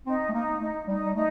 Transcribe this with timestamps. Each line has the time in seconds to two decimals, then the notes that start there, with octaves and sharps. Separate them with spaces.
0.06 C4 D#4
0.29 A3
0.33 A#3 D#4
0.60 A3 D#4
0.87 G3 D#4
1.05 G3
1.15 A3 D#4